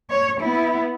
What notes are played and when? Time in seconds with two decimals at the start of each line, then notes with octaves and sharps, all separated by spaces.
0.10 C#5
0.40 B3 E4